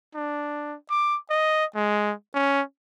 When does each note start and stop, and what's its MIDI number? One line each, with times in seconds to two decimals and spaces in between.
0.15 0.75 62
0.90 1.17 86
1.30 1.65 75
1.75 2.13 56
2.34 2.61 61